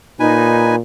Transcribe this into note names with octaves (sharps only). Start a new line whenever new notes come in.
A#2 D#4 B4 G#5